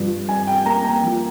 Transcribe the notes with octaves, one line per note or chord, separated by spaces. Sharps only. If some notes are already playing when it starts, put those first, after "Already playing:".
Already playing: G2 F3
G2 G#5
G5
A#3 A#5
A#5
F3